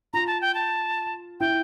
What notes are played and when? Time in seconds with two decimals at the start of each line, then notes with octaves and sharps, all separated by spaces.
0.13 F4 A#5
0.27 A5
0.41 G5
0.55 A5
1.40 E4 G5